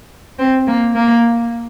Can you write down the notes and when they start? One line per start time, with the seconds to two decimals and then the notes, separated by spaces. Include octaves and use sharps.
0.39 C4
0.67 A#3
0.95 A#3